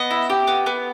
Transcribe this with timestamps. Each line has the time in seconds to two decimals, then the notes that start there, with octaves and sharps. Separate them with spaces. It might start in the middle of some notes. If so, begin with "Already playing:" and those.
Already playing: B3 D#5
0.11 E4
0.30 G4
0.47 B3
0.66 B3